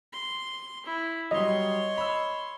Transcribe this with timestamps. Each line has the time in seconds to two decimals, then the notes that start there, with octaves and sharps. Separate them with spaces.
0.13 C6
0.86 E4
1.31 F#3 G3 C#5 D#5 C6
1.97 B5 E6